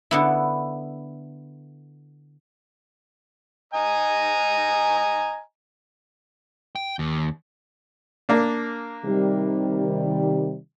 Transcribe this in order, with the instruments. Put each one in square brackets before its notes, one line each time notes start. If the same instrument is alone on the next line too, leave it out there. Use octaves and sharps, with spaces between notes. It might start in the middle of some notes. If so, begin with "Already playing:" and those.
[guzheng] D3 B3 E4
[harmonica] D#5 G#5 A#5
[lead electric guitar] G5
D#2
[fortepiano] A#3 D4
[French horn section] C3 D#3 G3